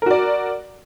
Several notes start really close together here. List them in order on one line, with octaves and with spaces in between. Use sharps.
A#4 F#4 D5